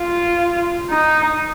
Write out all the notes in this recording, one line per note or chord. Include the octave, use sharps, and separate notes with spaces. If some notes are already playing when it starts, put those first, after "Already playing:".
Already playing: F4
D#4